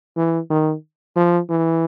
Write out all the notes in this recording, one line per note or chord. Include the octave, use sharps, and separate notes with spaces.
E3
D#3
F3
E3